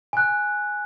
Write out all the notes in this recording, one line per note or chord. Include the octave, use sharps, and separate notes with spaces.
G#5 F#6